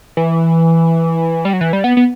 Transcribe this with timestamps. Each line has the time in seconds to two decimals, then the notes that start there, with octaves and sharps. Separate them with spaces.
0.17 E3
1.45 G3
1.53 F#3
1.61 E3
1.73 G3
1.84 B3
1.97 B3